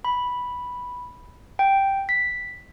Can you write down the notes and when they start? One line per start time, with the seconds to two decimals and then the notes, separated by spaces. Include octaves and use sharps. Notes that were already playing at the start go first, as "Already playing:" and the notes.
0.05 B5
1.59 G5
2.09 B6